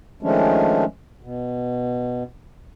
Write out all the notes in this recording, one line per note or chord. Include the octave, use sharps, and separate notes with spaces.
D#3 F3 G#3 A3 C#4 D4
B2